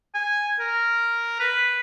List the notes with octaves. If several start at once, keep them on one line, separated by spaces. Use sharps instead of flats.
G#5
A#4
B4